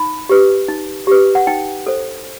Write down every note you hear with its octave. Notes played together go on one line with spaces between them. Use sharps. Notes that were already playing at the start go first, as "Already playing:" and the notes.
Already playing: D#4 B5
G4 B4
D#4
G4 B4
F#5
D#4 G5
A4 C5